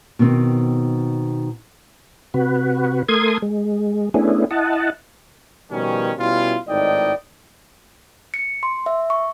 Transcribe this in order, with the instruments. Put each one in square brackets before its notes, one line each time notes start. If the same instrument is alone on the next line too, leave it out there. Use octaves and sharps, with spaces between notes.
[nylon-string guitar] B2 D#3 C4
[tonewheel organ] C3 F#4 B4
A3 A4 A#4 C6 D#6 G#6
G#3
A3 B3 C#4 D4 E4 G#4
E4 D#5 F#5 A5
[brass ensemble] B2 D#3 F3 G3 C#4
B2 G3 C#4 E4 F4
G#1 A2 D#4 D5 D#5 G5
[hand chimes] C#7
C6
E5
C#6